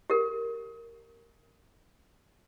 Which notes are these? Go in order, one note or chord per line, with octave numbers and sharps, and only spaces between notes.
G4 A#4